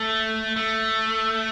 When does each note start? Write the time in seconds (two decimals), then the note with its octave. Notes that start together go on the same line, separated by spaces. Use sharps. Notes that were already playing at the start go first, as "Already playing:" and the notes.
Already playing: A3
0.56 A3